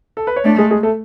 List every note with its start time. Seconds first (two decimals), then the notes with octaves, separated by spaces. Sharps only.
0.17 A4
0.27 B4
0.36 C#5
0.44 A3 D4 D5
0.58 G#3 G#4
0.71 G#3 G#4
0.83 A3 A4